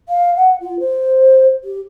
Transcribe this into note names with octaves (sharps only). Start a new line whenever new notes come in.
F5
F#5
F4
C5
G4